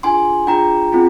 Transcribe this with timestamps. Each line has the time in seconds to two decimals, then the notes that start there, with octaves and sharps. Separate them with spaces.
0.03 D4 F4 G#4 G#5 C6
0.47 D4 F4 G#4 G5 A#5
0.92 C4 F4 G#4